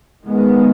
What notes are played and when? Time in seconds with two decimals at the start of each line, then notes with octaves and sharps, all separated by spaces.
0.24 D#3 G#3 B3